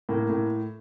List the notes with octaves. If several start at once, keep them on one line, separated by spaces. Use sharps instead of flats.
A2 A#3
A2